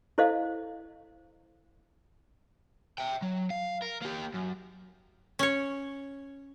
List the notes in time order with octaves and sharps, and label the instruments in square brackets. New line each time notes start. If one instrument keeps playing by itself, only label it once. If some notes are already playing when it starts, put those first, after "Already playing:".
[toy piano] E4 A4 C5 D#5 F5
[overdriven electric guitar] E5 G5
F#3
F5
A#4
A#3 G4
F#2
[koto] C#4 C#5